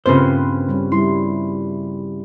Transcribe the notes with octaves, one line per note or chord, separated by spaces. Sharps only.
G2 C#3 A#3 C4 F4 B4 C5 C6
G3 C#4
G3 E4 C6